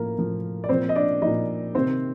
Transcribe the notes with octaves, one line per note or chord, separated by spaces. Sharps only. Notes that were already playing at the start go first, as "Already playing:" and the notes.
Already playing: A2 F3 A#3 A#4
A2 F3
D5
A#2 F3 C4 C5
D#5
D4 D5
A#2 F3 D#4 D#5
C3 D#3 C4 C5